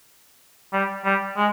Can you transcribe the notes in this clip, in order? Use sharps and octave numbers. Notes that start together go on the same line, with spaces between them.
G3
G3
G#3